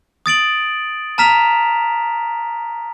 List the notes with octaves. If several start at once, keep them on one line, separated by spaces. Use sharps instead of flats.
D#6 A6 D7 F#7
A5 A#5 F6 B6 E7 F7